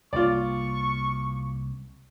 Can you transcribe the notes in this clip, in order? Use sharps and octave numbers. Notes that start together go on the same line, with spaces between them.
C2 A#3 F4 D5 C#6